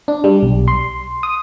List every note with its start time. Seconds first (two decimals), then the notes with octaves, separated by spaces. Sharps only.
0.08 D4
0.24 G3
0.43 B1
0.68 C6
1.23 D#6